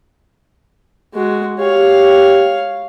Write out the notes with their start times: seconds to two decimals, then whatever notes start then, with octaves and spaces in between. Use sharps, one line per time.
1.14 G#3 F#4
1.60 G4 C#5 F5